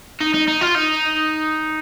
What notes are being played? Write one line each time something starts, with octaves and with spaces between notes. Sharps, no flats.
D#4
D#4
D#4
F4
D#4